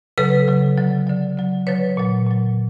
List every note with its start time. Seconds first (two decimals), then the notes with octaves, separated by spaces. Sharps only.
0.18 C#3 F#3 A4 B4
0.48 C#3 F#3
0.77 D3 F#3
1.07 D3 F#3
1.37 D3 F#3
1.67 D3 F#3 B4 C#5
1.97 A#2 F#3
2.27 A#2 F#3